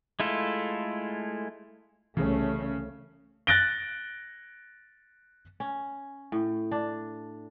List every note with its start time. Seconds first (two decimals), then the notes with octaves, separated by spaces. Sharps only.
0.20 G#3 A3 E4 F4 A4
2.17 C2 C#3 E3 A3 C#4
3.47 F#6 A6 A#6 D7 G7
5.60 C#4
6.32 A2
6.71 D4